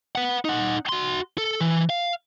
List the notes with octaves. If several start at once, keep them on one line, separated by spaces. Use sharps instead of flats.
B4 F#5
D#4 F#5
F#4 C6
A4
E3
F5